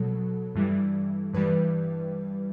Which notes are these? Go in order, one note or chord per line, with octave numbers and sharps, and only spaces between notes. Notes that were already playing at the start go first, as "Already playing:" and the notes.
Already playing: B2 F#3 A4
G2 E3 G3
G2 E3 G3 B4